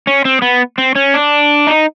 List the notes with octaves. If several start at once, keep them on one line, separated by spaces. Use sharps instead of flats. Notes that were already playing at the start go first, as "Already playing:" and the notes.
C#4
C4
B3
C4
C#4
D4
D#4